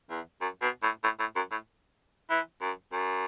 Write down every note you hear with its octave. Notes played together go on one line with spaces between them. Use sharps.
E2
F#2
B2
A2
A2
A2
F#2
A2
E3
F#2
F#2